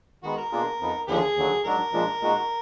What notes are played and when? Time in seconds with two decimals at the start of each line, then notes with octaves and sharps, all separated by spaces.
0.23 D#3 G#3 B3 F#4
0.37 A#4
0.52 B2 A#3 D4 F4 G#4
0.80 F2 F3 B3 D#4
1.08 D#2 D3 F3 B3 G#4
1.36 D#2 D3 F#3
1.64 G#2 F#3 D4 A#4
1.93 A#2 F3 G#3 D4
2.21 A#2 G#3 D#4 F#4